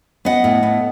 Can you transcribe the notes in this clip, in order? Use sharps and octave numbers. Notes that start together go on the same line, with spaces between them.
B3 D#5 F#5
A2
B3